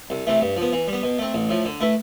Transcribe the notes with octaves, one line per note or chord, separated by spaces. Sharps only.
C2
C3 E3 A3
G2
F3 B3
E3
G3
B3
B2
A3 C4
A1
A2 F3
D3
A3 E4 B4